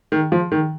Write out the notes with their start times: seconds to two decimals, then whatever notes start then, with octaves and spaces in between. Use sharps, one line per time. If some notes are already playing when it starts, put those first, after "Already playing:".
0.12 D#3
0.32 F3
0.52 D#3